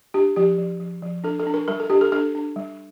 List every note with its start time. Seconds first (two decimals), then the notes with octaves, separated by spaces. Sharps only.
0.14 D4 G4
0.36 F3 G4
0.58 F3
0.80 F3
1.02 F3
1.24 D4 A4
1.40 A4
1.47 D4
1.54 A#4
1.68 G3 A#4
1.80 A4
1.90 D4 G4
2.01 A4
2.12 D4 A4
2.35 D4
2.56 G3